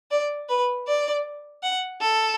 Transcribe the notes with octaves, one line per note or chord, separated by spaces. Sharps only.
D5
B4
D5
F#5
A4